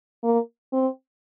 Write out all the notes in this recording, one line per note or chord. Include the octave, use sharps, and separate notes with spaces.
A#3
C4